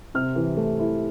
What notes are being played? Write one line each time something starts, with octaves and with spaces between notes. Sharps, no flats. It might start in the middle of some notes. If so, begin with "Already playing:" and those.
C3 F6
E3
A3
E4